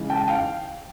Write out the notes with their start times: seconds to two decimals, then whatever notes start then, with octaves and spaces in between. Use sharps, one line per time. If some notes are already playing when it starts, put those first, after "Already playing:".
Already playing: C#3 E3 G#3
0.10 G5 A5
0.28 F5 G5